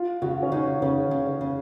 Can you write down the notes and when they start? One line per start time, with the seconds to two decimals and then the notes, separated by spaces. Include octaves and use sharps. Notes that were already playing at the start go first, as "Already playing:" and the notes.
Already playing: F4
0.22 C#3 F#4
0.42 C#4
0.52 C#3 D#4
0.82 C#3 C#4
1.11 C#3
1.27 C#4
1.41 C#3